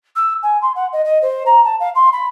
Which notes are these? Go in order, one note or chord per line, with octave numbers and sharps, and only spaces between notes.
E6
G#5
C6
F#5
D#5
D#5
C5
A#5
A5
F5
C6
B5